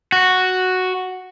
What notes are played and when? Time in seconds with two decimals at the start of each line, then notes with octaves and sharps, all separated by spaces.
0.12 F#4